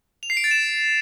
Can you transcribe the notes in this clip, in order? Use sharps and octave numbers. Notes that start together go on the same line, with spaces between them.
F7
C7
D7
A6
E7